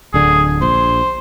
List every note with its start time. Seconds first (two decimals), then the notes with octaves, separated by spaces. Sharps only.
0.14 D1 D3 G#4
0.62 A#1 C5